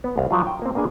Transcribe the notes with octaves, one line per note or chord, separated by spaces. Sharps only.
B3
C2 F5
F3 F#3 F4
G5
A#3 C4
A#3 B3 D4 G#4 G#5